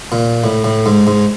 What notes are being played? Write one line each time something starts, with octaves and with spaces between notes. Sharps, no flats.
A#2
A2
A2
G#2
G#2